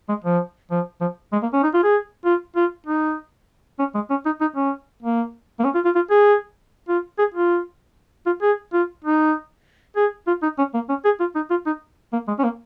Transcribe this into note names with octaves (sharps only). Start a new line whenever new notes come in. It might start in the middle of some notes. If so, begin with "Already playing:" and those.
G#3
F3
F3
F3
G#3
A#3
C#4
D#4
F4
G#4
F4
F4
D#4
C#4
G#3
C#4
D#4
D#4
C#4
A#3
A#3
C#4
F4
F4
F4
G#4
F4
G#4
F4
F4
G#4
F4
D#4
G#4
F4
D#4
C#4
A#3
C#4
G#4
F4
D#4
F4
D#4
A#3
G#3
C#4
A#3